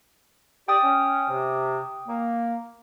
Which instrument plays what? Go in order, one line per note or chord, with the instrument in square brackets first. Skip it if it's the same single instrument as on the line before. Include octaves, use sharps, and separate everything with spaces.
[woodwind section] G4 D5 [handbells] G5 D#6
[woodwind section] C#4
C3
A#3